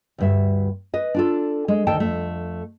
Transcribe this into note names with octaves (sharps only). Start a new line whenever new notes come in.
D2 G2 E5
B4 D#5
D4 F4 A4
G#3
D2 D#3 A4 G5 A5
F2 A3